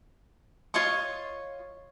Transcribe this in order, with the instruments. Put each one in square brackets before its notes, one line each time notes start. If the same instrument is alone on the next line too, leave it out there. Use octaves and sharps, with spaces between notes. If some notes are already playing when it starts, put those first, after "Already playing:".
[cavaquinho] F4 C#5 D#5 C#6